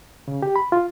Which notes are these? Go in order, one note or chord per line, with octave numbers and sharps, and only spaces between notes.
C#3
G4
B5
F4